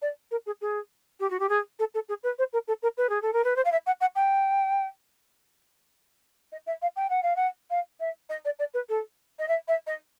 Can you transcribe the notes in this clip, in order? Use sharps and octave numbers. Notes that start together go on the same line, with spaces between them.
D5
A#4
G#4
G#4
G4
F#4
G4
G#4
A4
A4
G#4
B4
C5
A#4
A4
A#4
B4
G#4
A4
A#4
B4
C5
F5
E5
F#5
F#5
G5
D#5
E5
F5
G5
F#5
F5
F#5
F5
E5
D#5
D5
D5
B4
A4
D#5
E5
E5
D#5